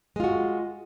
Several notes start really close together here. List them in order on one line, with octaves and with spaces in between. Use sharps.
G#3 F4 F#4